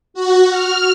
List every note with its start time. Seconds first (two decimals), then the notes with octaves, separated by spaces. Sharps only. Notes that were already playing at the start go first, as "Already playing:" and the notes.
0.14 F#4
0.50 F6